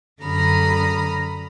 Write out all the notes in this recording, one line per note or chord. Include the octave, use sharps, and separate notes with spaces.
F#2 D3 A#5 B5 D#6 F6